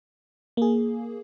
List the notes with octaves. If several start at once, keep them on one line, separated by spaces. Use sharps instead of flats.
A#3 G#4